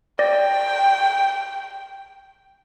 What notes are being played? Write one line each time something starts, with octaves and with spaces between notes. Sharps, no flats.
D5 G5 A#6